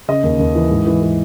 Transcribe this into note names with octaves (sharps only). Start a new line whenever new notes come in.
C#3 D#5
D#2
D#2
E3
G#2
E3
E3